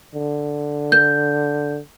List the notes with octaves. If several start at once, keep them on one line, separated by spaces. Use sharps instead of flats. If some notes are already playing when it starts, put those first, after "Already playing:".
D3
G6